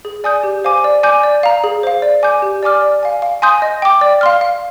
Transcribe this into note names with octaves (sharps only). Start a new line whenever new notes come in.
G#4
D5 G#5 D#6 G6
G4
C5 F5 G#5 D6
D5
G#5 D6 G6
D5
F5 A#5
G#4
C5 F5
D5
G#5 D6 G6
G4
D5 G#5 D6 F6
D5
F5 G#5
F5
G#5 C6 D#6 G6
D#5
G5 D6
D5
F5 C6 F6
F5